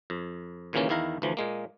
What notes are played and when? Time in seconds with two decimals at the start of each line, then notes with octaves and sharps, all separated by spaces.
0.10 F2
0.73 D#2 A#2 C#3 E3 A#3 C#4
0.89 E2 D#3 E4 F5 A#5
1.22 D2 E3 F3
1.37 A#2 G#3 A#3